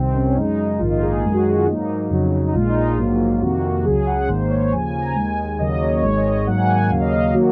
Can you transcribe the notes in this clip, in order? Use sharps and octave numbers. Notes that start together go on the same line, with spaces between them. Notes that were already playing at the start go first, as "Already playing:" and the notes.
Already playing: C2 C3 D#3 C4
C#4
C#4
F#2 C#3 G#3 D#4
A#1 G#2 D#3 A#3 F4
D#4
G#4
F#2 D#3 G#3 G#4
F#4
F#4
F4
G#2 F#3 A#3 D#4
F2 C#3 F#3
D#4
A#1 A#2 G#3 F4
D#4
F4
A#1 G#2 F#3 A#3
F2 C3 D#3 A#3 F#4
F#4
C#2 C#3 F#3 G#4
F#5
G#1 G#2 D#3 A#3 C5
C#5
D#2 C#3 F3 G#5
G#5
A#5
D#2 D#3 G#3 G#5
D#2 C#3 F#3 A#3 D#5
C#5
G#1 G#2 D#3 G#3 C#5
D#5
G#2 D#3 F#3 A#3 F#5
G#5
G#5
F#5
D#2 C#3 F#3 A#3 F5
D#5
F5
F5
D#3 F#3 A#3 F#4